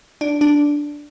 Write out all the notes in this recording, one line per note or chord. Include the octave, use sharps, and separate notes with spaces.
D4
D4